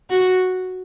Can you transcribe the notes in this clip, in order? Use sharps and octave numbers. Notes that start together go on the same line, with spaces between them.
F#4